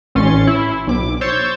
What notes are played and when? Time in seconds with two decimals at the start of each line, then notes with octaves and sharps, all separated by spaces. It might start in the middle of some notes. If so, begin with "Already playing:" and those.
0.15 A1 C#4 C6 A6 C#7
0.47 E4
0.87 B1 D6
1.21 C5 C#5 C#6 E6 G6 A6